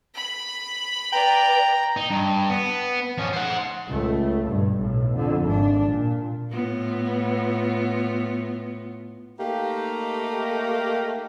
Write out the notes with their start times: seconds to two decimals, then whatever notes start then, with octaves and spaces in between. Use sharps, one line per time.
0.15 B5
1.13 B4 D5 G5 A#5
1.97 D#4
2.10 G2
2.50 B3
3.18 F3 C#4
3.33 C5 F#5
3.87 C#2 A3
4.46 G2 B2
4.77 B1 A2
5.14 F2 D3
5.45 G#1 D4
5.87 A#2
6.51 A2 B3 F4
9.39 A3 A#3 D#4 G4